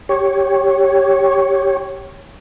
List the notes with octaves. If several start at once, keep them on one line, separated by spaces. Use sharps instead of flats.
G4 C#5